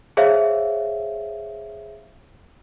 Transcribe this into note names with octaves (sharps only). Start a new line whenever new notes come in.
G#4 C5 C#5 E5 F5